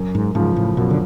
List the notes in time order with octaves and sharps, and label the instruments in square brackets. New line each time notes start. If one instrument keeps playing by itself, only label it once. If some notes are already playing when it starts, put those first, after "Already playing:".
Already playing: [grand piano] F#2
[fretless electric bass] G#2
[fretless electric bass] G#2 [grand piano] C#3 F3
[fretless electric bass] A2
[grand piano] F#2 [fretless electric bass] B2
[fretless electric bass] D3